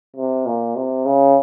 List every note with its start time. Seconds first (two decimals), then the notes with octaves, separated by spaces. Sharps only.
0.17 C3
0.47 A#2
0.76 C3
1.06 C#3